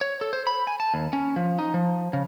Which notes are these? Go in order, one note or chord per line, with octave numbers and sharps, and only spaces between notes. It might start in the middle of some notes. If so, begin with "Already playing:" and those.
C#5
A4
C5
B5
G#5
A5
D#2
C#4
F3
D#4
F3
C#3